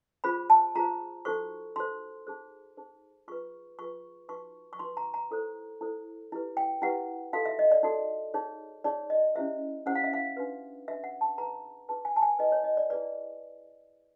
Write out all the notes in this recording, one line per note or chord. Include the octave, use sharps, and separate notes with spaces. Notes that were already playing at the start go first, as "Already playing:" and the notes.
F4 G#4 C5 B5
A5
F4 G#4 C5 A#5
D#4 F#4 A4 C5 C#6
D#4 F#4 A4 C5 C6
D#4 G#4 C5
D#4 G#4 C5
F4 G#4 B4 C#6
F4 G#4 B4 C#6
D#4 F#4 B4 C#6
C#6
D#4 F#4 B4 C6
A#5
A#5
E4 A4 C5
E4 A4 C5
E4 G4 B4
G5
E4 G4 B4 F#5
D#4 F#4 A4 F5
E5
D#5
D5
D#4 F#4 A4
D#4 G#4 C#5
D#4 G#4 C#5 D5
D#5
C#4 E4 G4 C5 E5
C#4 E4 G4 C5 F#5
F5
E5
F5
D4 F#4 B4
D4 F#4 B4 E5
F#5
A5
D#4 G#4 B4 A#5
D#4 G#4 B4 A5
G#5
A5
G#5
E4 G#4 B4 D#5
C#5
D#5
D5
E4 G#4 B4 D5